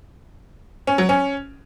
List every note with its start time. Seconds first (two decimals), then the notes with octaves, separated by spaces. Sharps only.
0.87 C#4
0.98 F#3
1.09 C#4